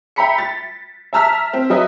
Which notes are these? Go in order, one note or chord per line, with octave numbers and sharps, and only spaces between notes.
E5 G5 A#5 B5 B6 C#7
A6
E5 A5 A#5 E6 F6 B6
C4
F#3 B4 D#5 E5